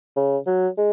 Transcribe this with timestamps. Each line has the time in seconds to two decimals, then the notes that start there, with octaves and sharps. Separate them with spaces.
0.16 C#3
0.47 F#3
0.77 G#3